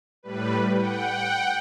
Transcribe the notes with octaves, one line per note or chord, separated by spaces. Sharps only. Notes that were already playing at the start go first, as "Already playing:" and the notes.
A2 G3 B4
F#5 G5